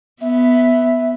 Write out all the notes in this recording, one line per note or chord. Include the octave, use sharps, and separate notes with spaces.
B3 E5